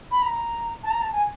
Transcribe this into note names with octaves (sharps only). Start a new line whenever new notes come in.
B5
A#5
A5
A#5
A5
G#5